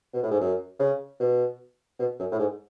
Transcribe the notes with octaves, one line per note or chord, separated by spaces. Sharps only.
B2
A2
G#2
F#2
C#3
B2
B2
F#2
A2
G#2